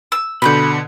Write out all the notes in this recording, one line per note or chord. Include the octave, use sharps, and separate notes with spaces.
E6
B2 D3 B5 C6 G6